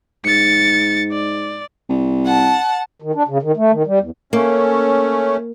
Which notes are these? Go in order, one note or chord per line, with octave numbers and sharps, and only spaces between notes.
G#2 A6 C#7
D5
C2
F#5 A5
D#3
D4
C#3
D#3
A3
D#3
G3
E2
A3 A#3 C#4